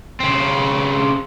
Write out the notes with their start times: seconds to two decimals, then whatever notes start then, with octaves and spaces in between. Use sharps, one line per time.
0.20 C#3 C4